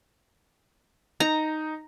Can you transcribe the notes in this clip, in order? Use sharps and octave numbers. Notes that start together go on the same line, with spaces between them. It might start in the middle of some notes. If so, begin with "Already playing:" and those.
D#4 A#5